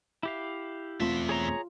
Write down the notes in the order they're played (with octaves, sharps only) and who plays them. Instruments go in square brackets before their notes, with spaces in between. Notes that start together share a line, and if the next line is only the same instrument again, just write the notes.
[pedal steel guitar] E4 G4 F5 [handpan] E5
[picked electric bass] E1 A3 C4 [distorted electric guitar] E2 E5 [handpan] F4
[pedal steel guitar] G#4 C#5 A#5